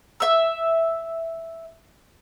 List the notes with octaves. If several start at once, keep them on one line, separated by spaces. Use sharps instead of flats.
E5 E6